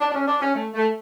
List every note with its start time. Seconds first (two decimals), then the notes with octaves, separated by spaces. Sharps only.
0.01 D4
0.11 D4
0.15 C#4
0.28 D4
0.41 C#4
0.56 A3
0.74 A3